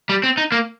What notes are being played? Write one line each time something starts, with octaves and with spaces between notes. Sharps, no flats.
G3
C4
D#4
A#3